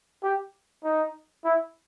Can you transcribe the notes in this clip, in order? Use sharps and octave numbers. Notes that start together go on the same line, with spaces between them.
G4
D#4
E4